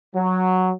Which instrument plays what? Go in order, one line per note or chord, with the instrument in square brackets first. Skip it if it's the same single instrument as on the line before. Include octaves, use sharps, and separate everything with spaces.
[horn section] F#3